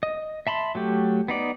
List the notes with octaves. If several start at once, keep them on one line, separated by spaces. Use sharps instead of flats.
D#5
E5 A5 B5 C6
F#3 A3 G4
B3 D#4 D5